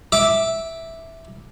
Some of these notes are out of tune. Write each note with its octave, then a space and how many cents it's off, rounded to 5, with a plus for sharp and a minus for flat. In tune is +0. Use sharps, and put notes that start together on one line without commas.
E5 -5 D6 +0